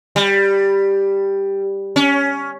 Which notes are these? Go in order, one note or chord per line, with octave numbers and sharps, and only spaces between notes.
G3
C#4